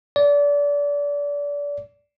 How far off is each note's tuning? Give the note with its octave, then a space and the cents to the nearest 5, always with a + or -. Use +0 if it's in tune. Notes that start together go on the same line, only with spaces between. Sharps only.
D5 -30